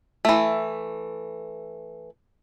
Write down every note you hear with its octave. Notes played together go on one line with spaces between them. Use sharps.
E3 A3